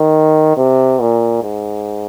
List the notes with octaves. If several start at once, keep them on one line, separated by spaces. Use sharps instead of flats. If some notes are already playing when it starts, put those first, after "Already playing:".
Already playing: D#3
C3
A#2
G#2